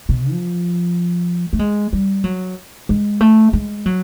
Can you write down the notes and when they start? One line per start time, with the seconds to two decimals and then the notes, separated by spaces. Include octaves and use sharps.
0.09 B2
0.30 F3
1.53 A3
1.59 G#3
1.93 G3
2.24 F#3
2.89 G#3
3.21 A3
3.53 G#3
3.86 F#3